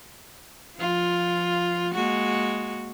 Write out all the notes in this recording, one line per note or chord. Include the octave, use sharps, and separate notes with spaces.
F3 F4
G#3 A#3 F#4